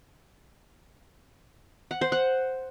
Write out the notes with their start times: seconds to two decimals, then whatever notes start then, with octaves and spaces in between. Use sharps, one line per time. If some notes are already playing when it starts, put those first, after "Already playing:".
1.91 F#5
2.01 C5
2.12 F#5